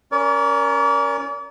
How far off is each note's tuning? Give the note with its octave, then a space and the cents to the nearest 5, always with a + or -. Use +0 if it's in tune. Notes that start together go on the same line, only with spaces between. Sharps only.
C#4 +0 A#4 +10 D5 -40